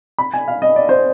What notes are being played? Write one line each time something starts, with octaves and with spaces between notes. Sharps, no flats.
B5
G#5
F5
D#5
D5
C5